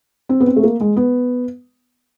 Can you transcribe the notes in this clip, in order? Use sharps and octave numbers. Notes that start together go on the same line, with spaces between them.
C4
B3
C4
A3
A#3
G#3
B3